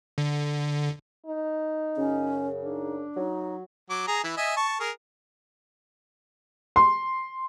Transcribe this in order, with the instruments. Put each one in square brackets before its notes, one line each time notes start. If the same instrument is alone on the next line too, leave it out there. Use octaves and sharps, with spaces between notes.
[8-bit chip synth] D3
[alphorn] D#4
[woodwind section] F#2 C#3 [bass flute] C#4
[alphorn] D4 [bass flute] D#4
[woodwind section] F#3 [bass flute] D#4
[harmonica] F#3 D6
G#4 A#5
E3 E4
D#5 E5 G#5
A5 C#6
G#4 A#4
[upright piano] C6